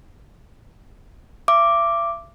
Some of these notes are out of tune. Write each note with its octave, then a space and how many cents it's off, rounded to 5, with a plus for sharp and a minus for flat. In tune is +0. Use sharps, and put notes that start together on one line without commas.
E5 +40 D6 +0